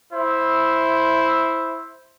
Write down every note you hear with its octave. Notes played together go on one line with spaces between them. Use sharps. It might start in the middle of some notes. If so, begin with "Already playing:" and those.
E4 C5